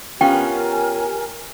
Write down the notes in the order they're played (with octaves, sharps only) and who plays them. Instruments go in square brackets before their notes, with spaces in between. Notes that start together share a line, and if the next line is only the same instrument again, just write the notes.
[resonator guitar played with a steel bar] B3 C#4 F4 [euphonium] G4 [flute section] A#4 G#5 [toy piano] G5